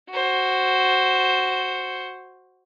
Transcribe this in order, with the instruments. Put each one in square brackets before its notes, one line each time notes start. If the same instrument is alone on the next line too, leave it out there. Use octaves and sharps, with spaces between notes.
[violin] F#4 C5